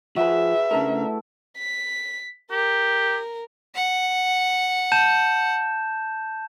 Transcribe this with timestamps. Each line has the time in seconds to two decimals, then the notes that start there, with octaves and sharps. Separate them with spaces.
0.16 F3 F#4 G#4 B4 E5
0.71 C#3 A3 D4 E4 A4 A#4
1.57 B6
2.51 G4 A#4
3.75 F#5
4.92 A5 G6 E7